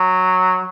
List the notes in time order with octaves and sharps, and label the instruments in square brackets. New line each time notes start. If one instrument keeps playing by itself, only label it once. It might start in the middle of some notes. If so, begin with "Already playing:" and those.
Already playing: [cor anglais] F#3